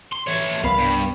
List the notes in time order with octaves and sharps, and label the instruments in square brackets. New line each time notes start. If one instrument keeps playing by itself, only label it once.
[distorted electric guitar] C6
E3 C#5
[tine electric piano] C2 B3 B5 [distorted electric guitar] F5
[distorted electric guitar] G2